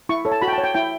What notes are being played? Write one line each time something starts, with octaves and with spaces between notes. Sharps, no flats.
E4 C#6
A4 C#5
A5
F#4 B5
G5
A5
C#5
G5
E4 G5